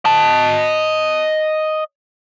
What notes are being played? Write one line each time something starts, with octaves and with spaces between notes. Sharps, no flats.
D#5 A5